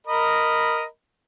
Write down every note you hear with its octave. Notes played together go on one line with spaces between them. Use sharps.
A#4 D#5 B5